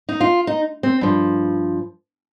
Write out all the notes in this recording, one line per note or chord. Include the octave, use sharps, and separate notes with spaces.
D#4
F4
D#4
C4
G2 F3